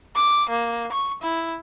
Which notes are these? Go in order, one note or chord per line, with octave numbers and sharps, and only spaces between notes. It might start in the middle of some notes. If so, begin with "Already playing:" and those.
D6
A#3
C#6
E4